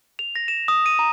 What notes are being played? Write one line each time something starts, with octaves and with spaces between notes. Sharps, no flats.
F7
A#6
E7
D#6
D#7
A#5